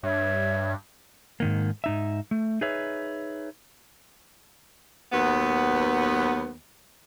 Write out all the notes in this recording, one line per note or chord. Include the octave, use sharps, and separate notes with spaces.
G2 C#5 E5
G#2 D#3 A#3
G#2 D#4 E5
A3
D#4 G#4 B4 C#5 E5
D#2 F#3 B3